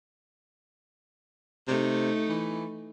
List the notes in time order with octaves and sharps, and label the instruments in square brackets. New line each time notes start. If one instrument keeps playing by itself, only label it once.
[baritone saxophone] C3 [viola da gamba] A3 D#4
[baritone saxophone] E3